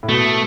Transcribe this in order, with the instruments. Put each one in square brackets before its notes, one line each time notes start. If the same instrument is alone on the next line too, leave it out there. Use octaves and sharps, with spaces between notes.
[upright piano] A2
[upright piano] B2 [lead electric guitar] A3